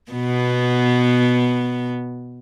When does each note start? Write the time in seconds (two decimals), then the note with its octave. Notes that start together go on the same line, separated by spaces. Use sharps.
0.11 B2 B3